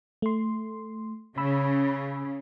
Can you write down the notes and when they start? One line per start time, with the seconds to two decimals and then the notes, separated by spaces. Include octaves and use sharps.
0.22 A3 C6
1.38 C#3 B5 E6